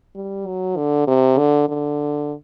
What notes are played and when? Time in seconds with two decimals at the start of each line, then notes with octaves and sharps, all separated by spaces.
0.16 G3
0.47 F#3
0.77 D3
1.07 C3
1.38 D3
1.69 D3